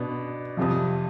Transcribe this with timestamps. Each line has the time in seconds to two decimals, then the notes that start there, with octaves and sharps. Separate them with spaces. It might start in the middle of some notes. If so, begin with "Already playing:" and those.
Already playing: B2 B3 D4
0.57 F2 C3 F3